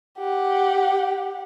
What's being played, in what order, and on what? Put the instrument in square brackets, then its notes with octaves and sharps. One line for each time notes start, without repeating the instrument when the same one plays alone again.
[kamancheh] G4 F#5